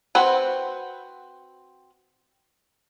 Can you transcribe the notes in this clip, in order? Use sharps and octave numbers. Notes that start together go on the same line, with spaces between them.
C4 F#4 B4 F#5